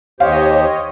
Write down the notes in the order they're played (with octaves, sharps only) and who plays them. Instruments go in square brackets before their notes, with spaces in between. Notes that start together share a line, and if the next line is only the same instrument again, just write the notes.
[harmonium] D#2 G4 C5 [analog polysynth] C#5 D#5 [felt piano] F5